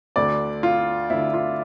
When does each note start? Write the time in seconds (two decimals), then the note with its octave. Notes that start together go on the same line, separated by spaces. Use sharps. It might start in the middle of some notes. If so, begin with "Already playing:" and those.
0.16 D2 D3 D5
0.63 F4
1.10 D2 D3 E4
1.34 F4